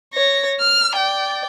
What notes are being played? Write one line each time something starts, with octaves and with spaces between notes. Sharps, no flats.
C#5 A#6
F6
D5 G5